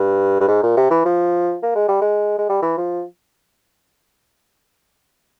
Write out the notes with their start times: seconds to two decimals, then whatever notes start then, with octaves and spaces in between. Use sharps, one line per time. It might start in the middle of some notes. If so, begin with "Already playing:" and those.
Already playing: G2
0.40 G2
0.48 G#2
0.63 A#2
0.77 C3
0.90 E3
1.05 F3
1.62 A#3
1.75 G#3
1.88 G3
2.01 G#3
2.38 G#3
2.49 G3
2.62 E3
2.77 F3